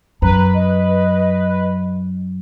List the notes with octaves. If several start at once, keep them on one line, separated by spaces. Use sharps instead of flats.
F#2 B4 A#5
D#5